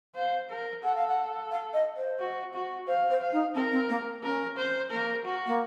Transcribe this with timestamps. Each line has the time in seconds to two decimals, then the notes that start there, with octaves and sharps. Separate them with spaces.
0.16 C5 F5
0.50 A#4
0.84 A4 F#5
0.96 F5
1.08 F#5
1.52 F5
1.74 D#5
1.97 C5
2.19 F#4
2.53 F#4
2.87 C5 F5
3.10 C5
3.21 F5
3.32 D#4
3.55 C4 A#4
3.72 C4
3.89 A#3
4.23 C#4 A#4
4.57 C5
4.91 A#3 A#4
5.25 F#4
5.47 A#3